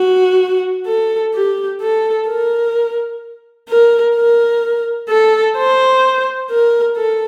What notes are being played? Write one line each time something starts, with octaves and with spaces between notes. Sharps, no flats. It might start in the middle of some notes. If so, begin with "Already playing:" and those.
Already playing: F#4
A4
G4
A4
A#4
A#4
A#4
A4
C5
A#4
A4